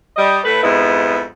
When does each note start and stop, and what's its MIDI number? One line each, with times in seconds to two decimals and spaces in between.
0.16 0.38 55
0.16 0.38 75
0.44 0.58 45
0.44 0.58 57
0.44 0.58 71
0.63 1.23 41
0.63 1.23 44
0.63 1.23 59
0.63 1.23 64